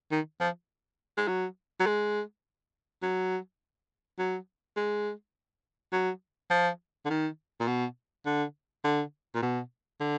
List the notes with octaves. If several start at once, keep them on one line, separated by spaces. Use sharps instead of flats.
D#3
F3
G#3
F#3
F#3
G#3
F#3
F#3
G#3
F#3
F3
D3
D#3
A#2
B2
D3
D3
A#2
B2
D3